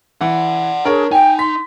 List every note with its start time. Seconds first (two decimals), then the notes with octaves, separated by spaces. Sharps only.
0.21 E3 D5 F#5
0.86 D4 G#4 A#4 C#5
1.12 D#4 G5 G#5
1.39 C6 B6